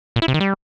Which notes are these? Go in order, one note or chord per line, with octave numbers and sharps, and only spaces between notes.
A#2
E4
C3
D#3
G3